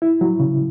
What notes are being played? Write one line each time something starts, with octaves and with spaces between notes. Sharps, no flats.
E4
F#3
C#3